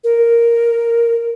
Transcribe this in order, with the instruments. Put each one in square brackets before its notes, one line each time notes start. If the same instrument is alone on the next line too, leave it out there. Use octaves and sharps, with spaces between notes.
[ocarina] A#4